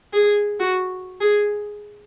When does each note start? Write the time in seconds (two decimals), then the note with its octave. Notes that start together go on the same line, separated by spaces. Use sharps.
0.13 G#4
0.60 F#4
1.21 G#4